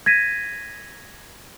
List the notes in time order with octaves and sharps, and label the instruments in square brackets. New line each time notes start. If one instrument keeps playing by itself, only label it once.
[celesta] G#6 A#6 B6 D#7